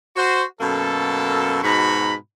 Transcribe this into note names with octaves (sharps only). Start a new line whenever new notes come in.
F#4 C5
F#2 B2 A#3 A4
G#2 B2 F#4 A#5 B5